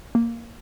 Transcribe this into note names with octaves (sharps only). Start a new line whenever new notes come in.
A#3